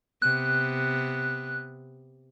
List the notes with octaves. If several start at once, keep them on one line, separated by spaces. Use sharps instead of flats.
C3 B3 F#6